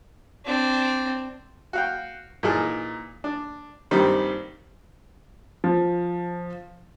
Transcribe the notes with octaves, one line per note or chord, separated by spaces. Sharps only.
C4 D4
F#4 F5 G5
A#2 E3 D#4 G#4 A5 F6
D4
A#1 G2 D#3 G3 C4
F3